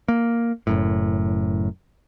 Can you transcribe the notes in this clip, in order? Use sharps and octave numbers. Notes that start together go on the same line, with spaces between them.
A#3
F#1 F#2 A2